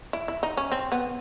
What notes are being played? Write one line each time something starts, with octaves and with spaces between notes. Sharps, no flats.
E4
E4
D#4
C#4
C4
B3